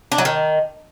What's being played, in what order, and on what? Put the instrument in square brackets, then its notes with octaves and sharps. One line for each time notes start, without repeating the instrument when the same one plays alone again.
[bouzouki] D4
F#3
D#3